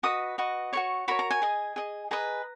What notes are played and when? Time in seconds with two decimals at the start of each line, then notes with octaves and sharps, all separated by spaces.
0.03 F#4 B4 D#5 D#6
0.38 F#4 B4 D#5
0.73 F#4 A#4 C#5 C#6
1.08 F#4 A#4 C#5 B5
1.19 A#5
1.31 G#5
1.42 G#4 D#5
1.76 G#4 D#5
2.11 G#4 B4 D#5 A#5